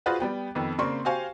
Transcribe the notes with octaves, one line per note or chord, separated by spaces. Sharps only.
F4 F#4 G#4 B4 C5 F#5
G3 B3 G5
F2 D#3 B3 A4
C#3 A#3 C4 D5 C6 C#6
F#4 G4 C5 F5 G#5 C#6